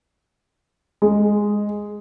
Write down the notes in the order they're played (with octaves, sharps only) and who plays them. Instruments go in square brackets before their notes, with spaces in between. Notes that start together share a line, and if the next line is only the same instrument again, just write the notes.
[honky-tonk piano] G#3